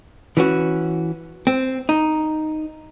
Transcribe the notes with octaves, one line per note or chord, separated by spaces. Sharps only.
E3 C#4 F#4
C4
D#4